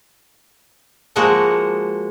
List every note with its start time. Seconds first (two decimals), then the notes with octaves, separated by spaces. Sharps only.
1.16 F3 G#3 A#3 F#4 A4 D#5